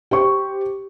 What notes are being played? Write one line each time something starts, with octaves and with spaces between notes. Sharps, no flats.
G4 C5 C#6